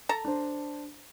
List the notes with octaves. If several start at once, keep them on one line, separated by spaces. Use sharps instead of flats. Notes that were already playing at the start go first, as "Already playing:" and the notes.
A4 A5 A#5
D4 C5